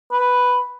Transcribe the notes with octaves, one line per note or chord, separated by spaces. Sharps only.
B4